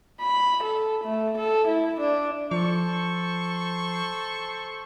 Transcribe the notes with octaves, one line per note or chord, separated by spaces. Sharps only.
B5
A4
A3
A4
E4
D4
F3 A4 C5 C#6